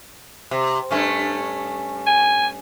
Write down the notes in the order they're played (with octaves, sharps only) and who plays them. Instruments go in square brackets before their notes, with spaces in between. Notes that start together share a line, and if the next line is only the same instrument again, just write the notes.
[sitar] C3
G2 A3 C#4
[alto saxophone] G#5